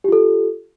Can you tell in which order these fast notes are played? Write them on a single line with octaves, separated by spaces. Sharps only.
G4 F4 A4